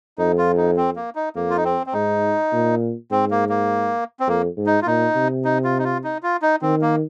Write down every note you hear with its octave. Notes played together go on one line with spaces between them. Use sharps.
F2 D#4
F4
D#4
C4
A#3
D#4
F2 A#3
F4
D#4
C4
C4
G#2 D#4
A#2
G#2 C4
A#3
A#3
C4
F2 A#3
G#2
D#4
F4
A#2 D#4
C3
D#4
F4
D#4
F4
D#4
F4
D#4
D#3 C4
A#3